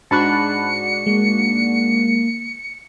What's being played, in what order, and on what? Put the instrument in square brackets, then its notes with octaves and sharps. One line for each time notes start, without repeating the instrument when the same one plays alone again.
[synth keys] G#2 D4 F#4 [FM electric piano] A5 B5 F#6 [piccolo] C#7
[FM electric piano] G#3 [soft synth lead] A#3